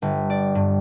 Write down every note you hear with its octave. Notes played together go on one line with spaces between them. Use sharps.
G1
D5
G2